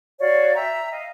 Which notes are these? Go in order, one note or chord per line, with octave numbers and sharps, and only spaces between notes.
F#4 C#5 D5 F5
E5 G5 A#5
D#5 F5